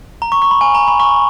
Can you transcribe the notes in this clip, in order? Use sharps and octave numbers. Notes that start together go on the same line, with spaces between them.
A#5
C#6
C#6
B5
G#5
A#5
B5
C#6